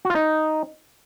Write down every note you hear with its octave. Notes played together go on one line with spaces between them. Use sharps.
F#4
F4
D#4